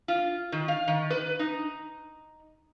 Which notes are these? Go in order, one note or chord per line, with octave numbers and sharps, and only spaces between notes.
F4
D#3
F5
D#3
B4
D#4